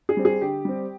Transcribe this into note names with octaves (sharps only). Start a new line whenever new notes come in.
G#4
G3 C4
G#4
D3 G4
G3 C4